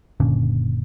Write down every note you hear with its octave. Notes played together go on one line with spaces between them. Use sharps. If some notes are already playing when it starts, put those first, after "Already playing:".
F#1 A#2 D3 C#4